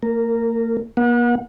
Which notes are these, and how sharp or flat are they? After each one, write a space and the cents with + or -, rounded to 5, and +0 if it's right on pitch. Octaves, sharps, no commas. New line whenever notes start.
A#3 -40 A#4 -10
A#3 +45 F#5 -35